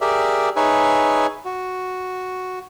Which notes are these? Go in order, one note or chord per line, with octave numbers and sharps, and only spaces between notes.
G4 G#4 A#4 D5 E5
D#4 G#4 B4 C#5 E5 G#5
F#4